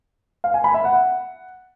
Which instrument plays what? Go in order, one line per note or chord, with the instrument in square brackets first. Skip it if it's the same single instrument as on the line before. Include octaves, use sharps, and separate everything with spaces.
[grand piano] F5
G#5
B5
E5
F#5